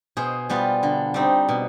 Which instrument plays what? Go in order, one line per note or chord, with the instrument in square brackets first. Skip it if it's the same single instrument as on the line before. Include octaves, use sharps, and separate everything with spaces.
[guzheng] B2 G#4 C5
G3 B3 F4
D3
G3 C4 D#4
B2